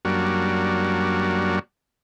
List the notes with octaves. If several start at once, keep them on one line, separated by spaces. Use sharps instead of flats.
F#2 F#3 G3 A#3 D4 F#4